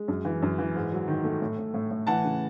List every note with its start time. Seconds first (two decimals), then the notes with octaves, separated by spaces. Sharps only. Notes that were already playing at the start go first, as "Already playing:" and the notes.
Already playing: G#3
0.08 F#2
0.25 E3
0.42 F#2
0.58 E3
0.75 G#2
0.92 F#3
1.08 D#3
1.24 A3
1.41 A2
1.58 A2
1.74 A2
1.91 A2
2.07 E3 F#5 A5
2.24 C#3